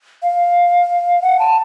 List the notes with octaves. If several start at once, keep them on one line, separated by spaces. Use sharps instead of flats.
F5
F#5
A5